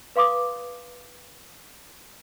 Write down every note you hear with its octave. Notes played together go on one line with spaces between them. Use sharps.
B4 F5 C6 D6 D#6